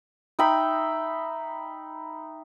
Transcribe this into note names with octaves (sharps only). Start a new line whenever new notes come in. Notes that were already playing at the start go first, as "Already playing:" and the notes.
D#4 E5 G5 B5